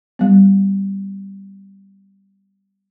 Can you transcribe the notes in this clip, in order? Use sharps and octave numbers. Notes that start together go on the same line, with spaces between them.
G3 B3